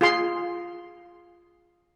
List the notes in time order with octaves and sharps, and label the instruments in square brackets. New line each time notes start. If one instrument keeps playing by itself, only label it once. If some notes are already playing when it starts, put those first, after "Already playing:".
[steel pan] F4 G#4 C6